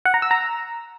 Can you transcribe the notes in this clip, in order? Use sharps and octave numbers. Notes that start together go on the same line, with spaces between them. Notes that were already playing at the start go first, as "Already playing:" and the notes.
F#5
A#5
E6
A#5